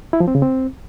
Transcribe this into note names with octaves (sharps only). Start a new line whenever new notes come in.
E4
F3
C4
C#3
C4